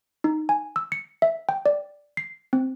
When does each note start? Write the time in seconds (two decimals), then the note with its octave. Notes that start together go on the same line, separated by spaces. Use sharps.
0.24 D#4
0.49 G#5
0.76 E6
0.92 C#7
1.22 E5
1.49 G5
1.66 D5
2.17 C7
2.53 C4